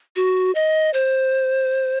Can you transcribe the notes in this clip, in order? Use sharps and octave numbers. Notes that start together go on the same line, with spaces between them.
F#4
D#5
C5